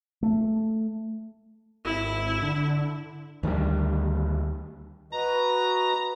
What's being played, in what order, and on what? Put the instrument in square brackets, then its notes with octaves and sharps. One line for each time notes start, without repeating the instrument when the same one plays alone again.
[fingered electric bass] A3
[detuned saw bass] G#1 [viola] E4
[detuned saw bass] D3
[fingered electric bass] D2 D#3 F#3 G3
[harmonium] F#4 B4 D#5 [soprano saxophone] A#5